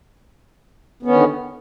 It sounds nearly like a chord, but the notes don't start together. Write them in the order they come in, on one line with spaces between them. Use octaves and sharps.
B3 C#4 D#3 D3